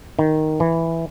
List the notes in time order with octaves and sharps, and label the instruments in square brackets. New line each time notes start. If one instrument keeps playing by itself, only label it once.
[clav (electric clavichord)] D#3
E3